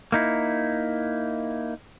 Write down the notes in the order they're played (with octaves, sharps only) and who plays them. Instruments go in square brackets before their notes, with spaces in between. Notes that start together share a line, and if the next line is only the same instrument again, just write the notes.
[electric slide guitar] A#3 D#4 E4